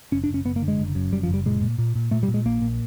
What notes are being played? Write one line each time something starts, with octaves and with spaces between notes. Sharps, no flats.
F#1 C#4
D4
F#1
C#4
F#1 B3
A#3
D3
G#3
F#1
F#2
F#1 G3
F3
F#1 G3
A#2 G#3
A#2
A#2
A#2
A#2 A3
G3
A#2
G#3
A#1 A#3
A#2